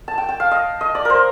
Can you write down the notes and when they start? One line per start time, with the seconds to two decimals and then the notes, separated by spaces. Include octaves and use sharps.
0.08 A5
0.18 G5
0.29 G5
0.40 F5
0.51 D#5
0.81 D#5
0.95 D5
1.05 A#4 C5